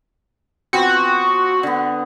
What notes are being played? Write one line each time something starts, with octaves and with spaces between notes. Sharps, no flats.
F3 B3 C4 F#4
D3 B3